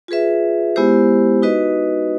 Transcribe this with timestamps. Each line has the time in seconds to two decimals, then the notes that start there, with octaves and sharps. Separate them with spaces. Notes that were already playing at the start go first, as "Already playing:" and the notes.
0.08 F4 G#4 B4 E5
0.76 G#3 B3 E4 G4 C5
1.42 D#4 F#4 B4 D#5